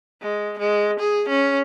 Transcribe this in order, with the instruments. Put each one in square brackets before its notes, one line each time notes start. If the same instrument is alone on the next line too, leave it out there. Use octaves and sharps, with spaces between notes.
[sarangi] G#3
G#3
G#4
C#4